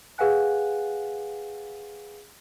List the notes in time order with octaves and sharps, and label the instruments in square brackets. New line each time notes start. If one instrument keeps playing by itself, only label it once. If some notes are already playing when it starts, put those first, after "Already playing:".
[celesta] G#4 B4 F5 F#5 G#5 F#6